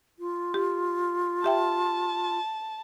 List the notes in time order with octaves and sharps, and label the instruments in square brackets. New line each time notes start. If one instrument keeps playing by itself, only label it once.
[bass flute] F4
[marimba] G4
[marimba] G4 E5 G5 [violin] A5